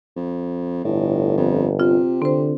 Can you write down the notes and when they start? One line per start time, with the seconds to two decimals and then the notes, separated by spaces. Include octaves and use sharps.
0.16 F2
0.84 G1 A2
1.37 F2
1.80 C3 F4
2.22 D3 C4 C5